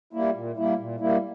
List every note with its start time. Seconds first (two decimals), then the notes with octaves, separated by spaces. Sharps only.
0.13 G3 A#3 E4
0.35 A#2
0.57 G3 A#3 E4
0.79 A#2
1.00 G3 A#3 E4